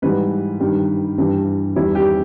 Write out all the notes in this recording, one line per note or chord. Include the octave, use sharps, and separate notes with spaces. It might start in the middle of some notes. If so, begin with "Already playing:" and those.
G#2 E3 G3 B4
G2 D#3 G3
G2 E3 G3
E2 D#3 G3 E4
G4